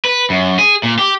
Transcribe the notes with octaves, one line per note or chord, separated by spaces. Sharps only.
B4
F#2
G#4
A#2
G4